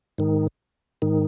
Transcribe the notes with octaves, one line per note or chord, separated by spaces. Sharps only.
G#2 D#3
G#2 D#3